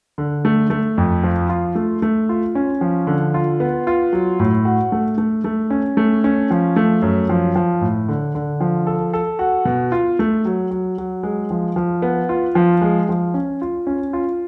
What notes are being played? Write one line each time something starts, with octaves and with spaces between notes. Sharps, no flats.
D3
A3
A3
F2
F3
F4
A3
A3
F4
C#4
F3
D3
F4
B3
F4
F#3
A2
F#4
A3
A3
A3
C#4
A3
C#4
F3
A3
F#2
F3
F3
A2
D3
D3
F3
A4
A4
F#4
B2
F4
A3
F#3
F#3
F#3
G#3
F3
F3
B3
F4
F3
G#3
F3
C#4
F4
C#4
F4